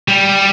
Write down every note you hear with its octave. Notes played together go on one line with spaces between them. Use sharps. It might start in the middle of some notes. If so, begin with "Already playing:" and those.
G3